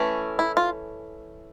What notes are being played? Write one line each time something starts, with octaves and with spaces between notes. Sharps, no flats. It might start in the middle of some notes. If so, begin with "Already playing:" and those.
Already playing: E3 A3 C#4
E4
F4